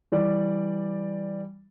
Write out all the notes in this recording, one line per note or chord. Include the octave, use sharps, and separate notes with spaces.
E3 G3 D5